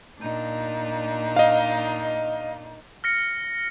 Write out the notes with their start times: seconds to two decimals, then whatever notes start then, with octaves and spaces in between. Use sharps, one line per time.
0.21 A#2 D4 D#4
1.36 D#5 F5
3.04 F6 A#6 C#7